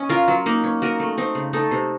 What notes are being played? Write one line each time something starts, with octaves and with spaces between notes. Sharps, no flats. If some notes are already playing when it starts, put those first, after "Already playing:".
Already playing: C#4 D#5
F4 A#4 F5
F#3
A#3 D#4
C#4
F#4 A#4 D#5
A3
C4 D#4
C#3
A3 D#4 A4
C3